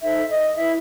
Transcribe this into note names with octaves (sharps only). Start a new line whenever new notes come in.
D#4 A4 C5 E5
D#5
E4 B4 E5